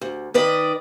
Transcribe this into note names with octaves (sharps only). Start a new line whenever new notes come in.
D2
D#3 B4 D5 D#5